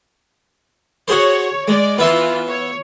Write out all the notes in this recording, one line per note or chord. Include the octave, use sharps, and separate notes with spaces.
F#4 G#4 C5 C#5
G#3 D5
E3 B3 F4 E5 C6
C#5